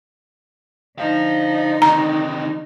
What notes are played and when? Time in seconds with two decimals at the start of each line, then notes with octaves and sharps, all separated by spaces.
0.98 D3 D#4 C5 F5
1.82 C3 D#3 A#5